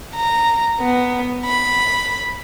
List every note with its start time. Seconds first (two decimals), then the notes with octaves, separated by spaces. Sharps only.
0.15 A#5
0.81 B3
1.45 B5